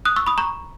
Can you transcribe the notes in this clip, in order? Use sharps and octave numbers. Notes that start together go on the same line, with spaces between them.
D#6 F#6
C#6 E6
B5 D#6
A#5 C#6